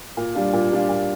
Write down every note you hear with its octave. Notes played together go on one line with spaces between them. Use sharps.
A#2
G3 D4 F4
A#2
G3 D4 F4
A#2